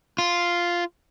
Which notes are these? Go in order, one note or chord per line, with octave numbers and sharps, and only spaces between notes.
F4